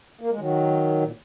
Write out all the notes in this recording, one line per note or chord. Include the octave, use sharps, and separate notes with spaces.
A#3
G#3
D#3 F#3
A#2